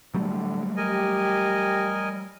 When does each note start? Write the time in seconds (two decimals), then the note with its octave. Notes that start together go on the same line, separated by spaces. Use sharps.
0.14 A2 D3 F#3 G3 A3
0.77 G4 A#4 D#5 G#5